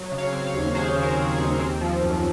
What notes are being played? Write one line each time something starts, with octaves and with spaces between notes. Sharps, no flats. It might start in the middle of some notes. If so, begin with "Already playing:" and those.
Already playing: F#3
C#3
C#5 F5
C4
C#5 F5
D#2
F#3 G#4 C5
C#3
A#4
C4
G#4
D#2
C4
F3
F#2